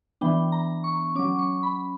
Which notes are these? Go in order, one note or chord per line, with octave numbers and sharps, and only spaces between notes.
E3 B3 D4 G5
A#5
C#6
F#3 C#4 D6
C#6
B5